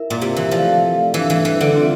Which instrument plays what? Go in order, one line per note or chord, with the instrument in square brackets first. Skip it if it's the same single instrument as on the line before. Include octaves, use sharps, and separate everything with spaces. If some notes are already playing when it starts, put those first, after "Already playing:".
Already playing: [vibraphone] E4 A#4 E5
[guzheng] A#2
C3
E3
[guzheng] F3 [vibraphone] A3 E4 A4 D5 F5
[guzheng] E3 [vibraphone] G3 D4 A4
[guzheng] E3
E3
D3
[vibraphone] C4 F4 A4 E5